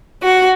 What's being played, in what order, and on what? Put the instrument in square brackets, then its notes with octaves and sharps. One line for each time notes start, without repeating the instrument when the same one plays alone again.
[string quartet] F#4